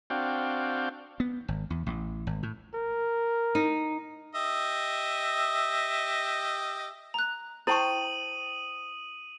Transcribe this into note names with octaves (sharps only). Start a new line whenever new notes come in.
C4 D4 F#4 F5 G5
B3
G#1
E2
A1
G#1
A2
A#4
D#4
G4 D#5 E5
A#5 F#6
E4 C5 G5 A5 C#6 D#6 D#7 F#7